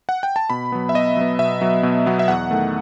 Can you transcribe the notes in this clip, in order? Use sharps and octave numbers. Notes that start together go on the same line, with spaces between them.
F#5
G5
A5
B2 B5
F#3 B3
E5
B2 D#5
F#3 B3
B2 E5
F#3 B3
B2
F#3 B3
E5
E2 F#5
D#3 A3